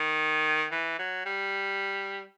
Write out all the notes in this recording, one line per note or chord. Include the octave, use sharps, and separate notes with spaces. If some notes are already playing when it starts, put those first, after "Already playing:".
Already playing: D#3
E3
F#3
G3